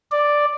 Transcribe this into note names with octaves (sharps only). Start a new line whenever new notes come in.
D5